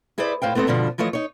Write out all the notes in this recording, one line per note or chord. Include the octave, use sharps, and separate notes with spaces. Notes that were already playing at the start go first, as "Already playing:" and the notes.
E4 G#4 B4 C5 D5
A2 C5 F5 G5
A3 B3 C4 A4 D#5
G2 B2 D3 F3
E3 F3 A3 C#5 D#5
D#4 C#5